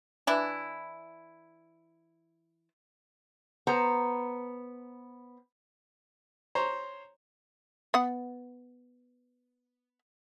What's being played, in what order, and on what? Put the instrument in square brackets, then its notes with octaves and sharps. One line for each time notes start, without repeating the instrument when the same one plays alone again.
[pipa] E3 D4 E4
[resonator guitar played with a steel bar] B3 C5 A#5
[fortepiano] C5 C#5 A#5
[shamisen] B3 F#5